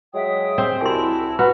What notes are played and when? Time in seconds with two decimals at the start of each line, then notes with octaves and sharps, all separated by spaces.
0.14 F#3 G#3 E5 G5 D#6
0.58 C4
0.81 C2 E4 F#4 G#5 A5 C6
1.39 F#4 B4 F#5 A#5 B5